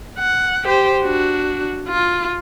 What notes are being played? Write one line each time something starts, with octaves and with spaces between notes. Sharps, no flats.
F#5
G4 C5
D4 F#4
F4